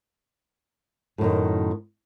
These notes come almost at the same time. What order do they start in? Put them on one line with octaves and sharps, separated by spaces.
A2 F#2 D#3